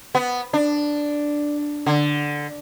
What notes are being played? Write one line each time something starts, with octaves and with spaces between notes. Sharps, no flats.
B3
D4
D3